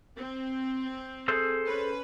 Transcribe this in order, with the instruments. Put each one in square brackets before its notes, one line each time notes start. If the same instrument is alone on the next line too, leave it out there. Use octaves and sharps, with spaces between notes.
[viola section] C4
[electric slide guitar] G#4 A4 C5
[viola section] C#4 B4